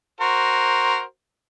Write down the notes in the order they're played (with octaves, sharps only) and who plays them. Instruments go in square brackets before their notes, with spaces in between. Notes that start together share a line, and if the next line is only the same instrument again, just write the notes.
[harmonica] F#4 A#4 C5